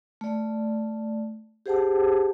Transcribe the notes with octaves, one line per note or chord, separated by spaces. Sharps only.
A3 D5
G4 G#4 C5 F#5 G5 A5